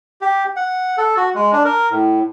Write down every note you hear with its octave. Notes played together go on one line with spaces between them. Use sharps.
G4
F#5
A4
F#4
G#3
D4
A#4
A2